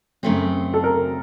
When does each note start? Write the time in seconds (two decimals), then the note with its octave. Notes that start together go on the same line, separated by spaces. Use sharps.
0.23 F#2 C#3 A3 C4
0.74 A4
0.84 A#4